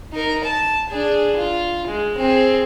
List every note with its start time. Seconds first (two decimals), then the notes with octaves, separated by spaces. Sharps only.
0.13 D#4 A#4
0.44 A5
0.90 D4 G#4
1.37 F4
1.87 G#3
2.18 C4 G#4